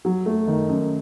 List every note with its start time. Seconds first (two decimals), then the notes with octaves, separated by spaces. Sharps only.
0.05 F#3
0.26 A3
0.47 D#3
0.69 F#2